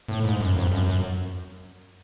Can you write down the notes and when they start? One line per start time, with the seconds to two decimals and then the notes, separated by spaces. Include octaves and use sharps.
0.08 A2
0.24 G#2
0.40 F#2
0.56 F2
0.72 F#2
0.87 F#2